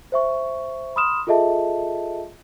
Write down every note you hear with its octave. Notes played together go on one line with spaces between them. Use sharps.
C5 E5 C#6
B5 C6 D#6 F6 E7
F4 G#4 A4 D#5 E5 A5